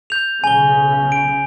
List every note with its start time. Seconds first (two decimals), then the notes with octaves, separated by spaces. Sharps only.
0.10 G6 F7
0.44 B1 C#3 G#5 G7
1.12 D7